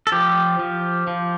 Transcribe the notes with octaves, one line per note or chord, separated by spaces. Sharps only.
A4
F3 G4
F3
F3